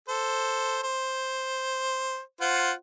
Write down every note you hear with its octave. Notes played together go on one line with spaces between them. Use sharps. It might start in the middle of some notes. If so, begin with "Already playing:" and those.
A4 C5
C5
F4 C5 F#5